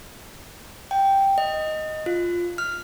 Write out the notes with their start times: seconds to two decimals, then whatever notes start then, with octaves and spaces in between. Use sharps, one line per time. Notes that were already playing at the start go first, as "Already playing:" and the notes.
0.91 G5
1.38 D#5
2.06 F4
2.58 F6